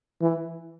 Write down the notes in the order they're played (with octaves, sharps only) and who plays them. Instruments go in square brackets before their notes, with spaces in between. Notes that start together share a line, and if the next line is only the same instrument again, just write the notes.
[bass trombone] E3